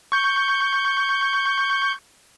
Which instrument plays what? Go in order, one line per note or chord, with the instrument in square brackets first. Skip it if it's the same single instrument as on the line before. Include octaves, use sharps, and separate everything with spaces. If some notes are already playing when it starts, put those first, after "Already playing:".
[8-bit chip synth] C#6 G6